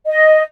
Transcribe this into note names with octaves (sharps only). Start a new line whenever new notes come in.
D#5